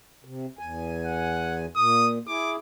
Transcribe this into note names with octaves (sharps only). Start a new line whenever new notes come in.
C3
E2 G#5
F#5
A#2 D#6
E4 G#4 D6